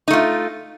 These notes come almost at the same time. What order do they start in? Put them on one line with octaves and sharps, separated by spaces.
D#4 A3 F4